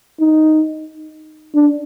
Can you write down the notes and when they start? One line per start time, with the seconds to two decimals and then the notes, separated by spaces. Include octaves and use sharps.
0.20 D#4
1.54 D4